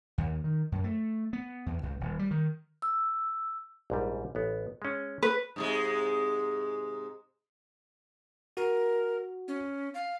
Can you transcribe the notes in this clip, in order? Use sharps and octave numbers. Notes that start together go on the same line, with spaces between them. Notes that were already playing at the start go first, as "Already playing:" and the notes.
D#2
D#3
F#2
A3
B3
E2
C#2
D#1
G3
D#3
E6
A#1 G#2 G3
A1 B3
G#3 C#4
B4
G#2 C3 G#3
F#4 A#4
C#4
F5